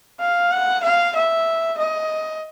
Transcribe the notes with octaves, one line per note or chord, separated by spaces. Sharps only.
F5
F#5
F5
E5
D#5